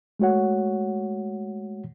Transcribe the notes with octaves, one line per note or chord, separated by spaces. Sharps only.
G#3 A3 F#4 C#5 F#5